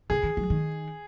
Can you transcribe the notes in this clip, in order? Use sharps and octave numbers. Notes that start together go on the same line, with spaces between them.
C#3 G#4
D#3
F#3
D#3